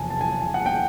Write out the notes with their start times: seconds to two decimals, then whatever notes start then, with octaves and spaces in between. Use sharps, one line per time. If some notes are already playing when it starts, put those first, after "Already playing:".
Already playing: F1 E2 F#3 G#5 A5
0.10 A5
0.21 G#5
0.54 F#5
0.66 G5